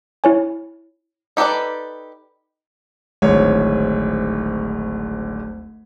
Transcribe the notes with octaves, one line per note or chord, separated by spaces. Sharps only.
E4 C#5 G#5
D#4 G4 A4 B4 D5
D1 G#1 C#5